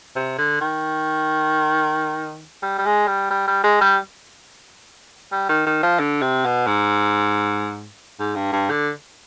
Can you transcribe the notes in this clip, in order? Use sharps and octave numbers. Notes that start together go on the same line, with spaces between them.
C3
D3
D#3
G3
G3
G#3
G3
G3
G3
G#3
G3
G3
D#3
D#3
F3
D3
C3
B2
G#2
G#2
G2
G2
D3